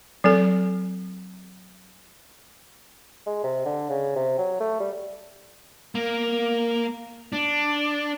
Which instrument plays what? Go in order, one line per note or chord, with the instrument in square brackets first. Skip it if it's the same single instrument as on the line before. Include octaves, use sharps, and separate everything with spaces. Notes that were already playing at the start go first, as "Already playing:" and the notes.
[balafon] F#3 C4 A4
[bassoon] G#3
C3
D3
C#3
C3
F#3
A3
G3
[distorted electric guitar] A#3
D4